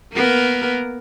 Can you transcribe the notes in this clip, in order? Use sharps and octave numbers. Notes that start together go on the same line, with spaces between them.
A#3 B3 A#4